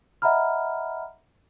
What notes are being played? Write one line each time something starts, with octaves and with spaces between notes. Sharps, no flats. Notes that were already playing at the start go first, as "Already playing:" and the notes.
D#5 E5 F#5 A#5 B5 F6